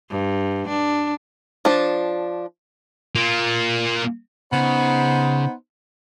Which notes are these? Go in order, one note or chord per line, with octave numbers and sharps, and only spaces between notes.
G2
D4
F3 D4
A#3 F4
C#3 B3 D#4 C5